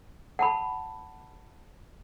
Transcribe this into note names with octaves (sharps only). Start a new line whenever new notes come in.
F#5 A5 B5